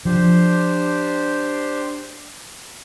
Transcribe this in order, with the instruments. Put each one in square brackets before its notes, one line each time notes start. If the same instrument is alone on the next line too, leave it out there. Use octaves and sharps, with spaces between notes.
[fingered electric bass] F3 [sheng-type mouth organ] D4 G4 C5